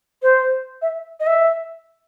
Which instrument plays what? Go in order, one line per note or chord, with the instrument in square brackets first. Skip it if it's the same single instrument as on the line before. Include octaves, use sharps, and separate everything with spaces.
[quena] C5
E5
D#5
E5